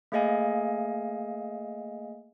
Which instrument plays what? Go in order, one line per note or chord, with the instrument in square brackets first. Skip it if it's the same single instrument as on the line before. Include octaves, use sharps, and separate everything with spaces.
[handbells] A3 A#3 G#4 D#5 F5 G#5